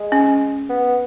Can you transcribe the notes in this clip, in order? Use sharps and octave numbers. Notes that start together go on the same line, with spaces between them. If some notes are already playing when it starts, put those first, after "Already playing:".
Already playing: G#3
C#4
B3